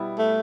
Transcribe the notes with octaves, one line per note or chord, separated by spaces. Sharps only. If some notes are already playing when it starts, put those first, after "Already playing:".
Already playing: B2 G3 B3 E4
A3